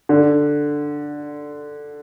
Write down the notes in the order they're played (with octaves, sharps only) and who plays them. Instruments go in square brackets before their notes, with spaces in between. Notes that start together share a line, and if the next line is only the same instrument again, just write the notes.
[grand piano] D3